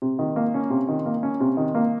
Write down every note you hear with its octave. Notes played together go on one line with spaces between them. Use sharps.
C3
D#3
A#3
C#4
C3
D#3
A#3
C#4
C3
D#3
A#3